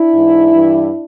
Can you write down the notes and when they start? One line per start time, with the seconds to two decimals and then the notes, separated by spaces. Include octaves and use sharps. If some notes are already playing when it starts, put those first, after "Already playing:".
Already playing: D4 E4
0.13 G#2 E3
0.51 G2 E3